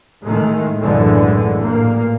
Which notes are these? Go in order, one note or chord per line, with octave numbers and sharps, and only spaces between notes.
A2 D#3 G#3 A3
B1 F#2 A2 D3 E3 G#3
A1 A#2 A#3